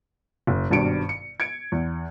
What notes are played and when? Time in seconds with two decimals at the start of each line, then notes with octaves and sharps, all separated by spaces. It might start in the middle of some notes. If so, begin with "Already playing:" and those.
0.47 F#1
0.70 G#1 G2 B2 C#7 D7
1.09 C#7
1.40 G#6 C#7 D7
1.72 E2